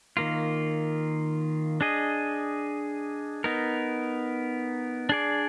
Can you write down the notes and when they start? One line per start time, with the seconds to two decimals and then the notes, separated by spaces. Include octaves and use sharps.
0.17 D#3 A#3 F4
1.81 D4 G#4 D#5
3.44 B3 D#4 A#4
5.09 D4 G#4 D5